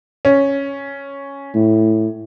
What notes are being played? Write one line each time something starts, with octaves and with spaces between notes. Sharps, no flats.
C#4
A2